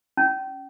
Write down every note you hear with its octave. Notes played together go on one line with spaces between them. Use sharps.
C#4